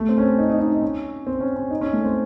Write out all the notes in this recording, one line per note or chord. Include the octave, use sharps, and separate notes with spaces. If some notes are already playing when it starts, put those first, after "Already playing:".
Already playing: A3
C4
C#4
C4
D#4
D#4
D#4
D#4
C#4
C4
C#4
C#4
D#4
C#4
A3
C4